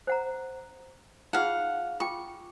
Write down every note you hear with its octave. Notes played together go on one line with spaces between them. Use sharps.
C5 F#5 A#5
D#4 F4 G#4 F5 F#5
F4 G5 C#6 D6